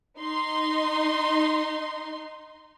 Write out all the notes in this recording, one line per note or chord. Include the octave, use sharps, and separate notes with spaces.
D#4 C6